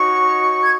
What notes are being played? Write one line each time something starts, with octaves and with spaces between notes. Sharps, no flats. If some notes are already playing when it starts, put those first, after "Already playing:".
Already playing: D#4 F#4 C#5 C#6
G#6